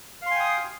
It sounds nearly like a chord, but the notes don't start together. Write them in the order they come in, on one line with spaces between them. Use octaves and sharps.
F5 C6 G#5 G5 D#6